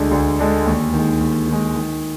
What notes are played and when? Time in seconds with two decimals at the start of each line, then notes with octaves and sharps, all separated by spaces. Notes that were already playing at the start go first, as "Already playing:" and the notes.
Already playing: D2 D3 G#3 D4
0.11 D2
0.39 D3 G#3 D4
0.66 D#2
0.94 D#3 G#3
1.21 D#2
1.48 D#3 G#3
1.75 D#3